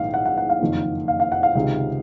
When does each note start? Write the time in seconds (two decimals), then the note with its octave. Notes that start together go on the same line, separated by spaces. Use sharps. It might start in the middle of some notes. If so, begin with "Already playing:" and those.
Already playing: A#1 G#2 D#3 F5
0.14 F#5
0.25 F#5
0.37 F#5
0.49 F5
0.61 F#1 F2 D#3
1.08 F5
1.20 F5
1.32 F#5
1.43 F5
1.55 C#2 C3 D#3